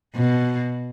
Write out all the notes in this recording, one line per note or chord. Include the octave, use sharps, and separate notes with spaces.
B2